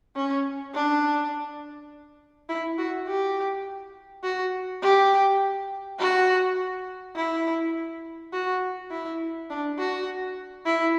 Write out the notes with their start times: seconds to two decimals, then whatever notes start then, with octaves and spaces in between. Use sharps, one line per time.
0.16 C#4
0.74 D4
2.49 E4
2.78 F#4
3.08 G4
4.24 F#4
4.82 G4
5.99 F#4
7.16 E4
8.33 F#4
8.91 E4
9.50 D4
9.79 F#4
10.66 E4